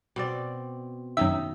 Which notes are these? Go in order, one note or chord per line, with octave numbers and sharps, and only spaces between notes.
B2 C4 D5
F#2 D#3 D#4 E5